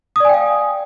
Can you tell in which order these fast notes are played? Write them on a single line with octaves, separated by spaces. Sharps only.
D#6 D5 G#5 G5 F5